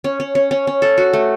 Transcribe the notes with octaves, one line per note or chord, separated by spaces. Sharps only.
C#4
C#4
C#4
C#4
C#4
A4
F#4
A3